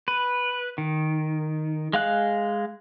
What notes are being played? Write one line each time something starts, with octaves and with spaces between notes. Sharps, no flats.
B4
D#3
G#3 F5 F#6